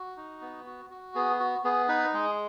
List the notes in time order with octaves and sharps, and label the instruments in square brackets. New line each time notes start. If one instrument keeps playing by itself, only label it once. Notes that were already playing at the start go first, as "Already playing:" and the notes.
Already playing: [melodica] F#4
D#4
B3
F#4
F#4
B3 G#4
F#4
B3 G#4
D#4 B4
G#3 G#4